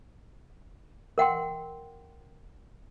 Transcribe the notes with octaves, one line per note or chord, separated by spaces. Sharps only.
A#4 F#5 G5 C6